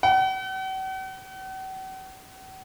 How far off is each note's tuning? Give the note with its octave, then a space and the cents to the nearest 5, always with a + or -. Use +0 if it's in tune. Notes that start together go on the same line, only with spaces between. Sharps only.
F#5 +45